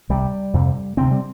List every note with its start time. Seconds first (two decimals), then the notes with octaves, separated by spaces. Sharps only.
0.09 C2 C3 G3
0.53 F2 C3
0.97 D2 C3 C4
1.11 G3